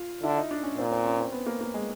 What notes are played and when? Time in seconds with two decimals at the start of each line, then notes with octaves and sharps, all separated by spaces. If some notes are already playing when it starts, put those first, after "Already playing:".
Already playing: F4
0.23 D3 E4
0.37 D#4
0.51 D4
0.64 C#4
0.78 A#2 C4
0.91 C4
1.05 C#4
1.19 C4
1.32 B3
1.46 A#3
1.61 A#3
1.74 G#3